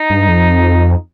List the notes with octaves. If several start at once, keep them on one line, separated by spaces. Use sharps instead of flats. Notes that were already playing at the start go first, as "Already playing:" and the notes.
Already playing: D#4
G2
F2